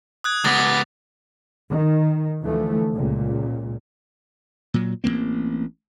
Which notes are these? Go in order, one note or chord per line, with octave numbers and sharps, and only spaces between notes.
D#6 F#6 G#6
C#2 B3 D6 A6 A#6
D6
D#3
D2 E3 F3 A3
C#2 A#2
A#2 F#3
A1 E3 A#3 C4